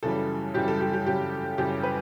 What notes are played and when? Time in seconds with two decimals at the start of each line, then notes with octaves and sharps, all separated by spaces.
0.03 F#2 C#3 E3 G3 A4
0.54 F#2 C#3 E3 G3 G4
0.68 A4
0.81 G4
0.93 G4
1.06 F#2 C#3 E3 G3 G4
1.58 F#2 C#3 E3 G3 G4
1.83 B4